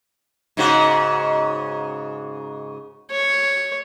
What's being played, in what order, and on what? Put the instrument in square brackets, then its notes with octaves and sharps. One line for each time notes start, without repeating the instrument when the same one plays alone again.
[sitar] G#2 C#3 F#4
[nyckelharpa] C#5